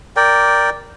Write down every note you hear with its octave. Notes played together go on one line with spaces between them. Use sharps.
A#4 D5 G5